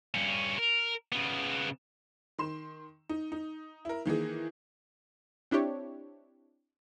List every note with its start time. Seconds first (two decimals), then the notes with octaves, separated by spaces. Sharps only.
0.14 G2 C#4
0.58 A#4
1.12 C#3 B3
2.38 D#3 C6 E7
3.09 D#4
3.32 D#4
3.85 E4 A#4
4.05 D#3 E3 A#3 G#4
5.51 C4 D4 E4 G4 C#5